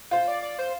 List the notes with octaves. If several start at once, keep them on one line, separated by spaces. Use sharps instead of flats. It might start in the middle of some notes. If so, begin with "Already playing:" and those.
F4 C5
D5
D5
C5